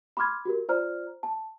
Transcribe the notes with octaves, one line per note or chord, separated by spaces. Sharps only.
B5 C6 D6 F6 G#6
F#4 G4 A#4
F4 C5 D5 A#5 F6
A5